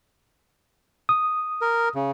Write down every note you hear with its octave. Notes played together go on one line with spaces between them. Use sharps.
D#6
A#4
C#3